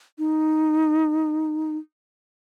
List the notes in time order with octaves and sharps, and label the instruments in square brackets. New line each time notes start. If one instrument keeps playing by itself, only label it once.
[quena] D#4